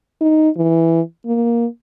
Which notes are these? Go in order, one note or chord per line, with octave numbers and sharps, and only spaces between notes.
D#4
E3
A#3